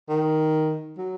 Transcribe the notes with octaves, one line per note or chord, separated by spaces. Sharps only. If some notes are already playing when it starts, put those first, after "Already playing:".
D#3
F#3